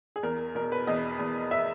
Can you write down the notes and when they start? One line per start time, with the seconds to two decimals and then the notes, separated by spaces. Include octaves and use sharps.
0.16 G#4
0.23 E2 A#4
0.55 B2 A#4
0.72 B4
0.87 E2 D#5
1.19 E2
1.51 E5